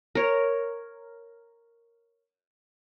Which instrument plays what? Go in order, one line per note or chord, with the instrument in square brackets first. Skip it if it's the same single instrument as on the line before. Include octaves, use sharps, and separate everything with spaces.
[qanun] A#4 C#5